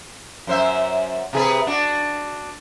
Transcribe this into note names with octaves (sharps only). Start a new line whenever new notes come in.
F#2 C5 E5
C3 G#4 B4
D4 F#4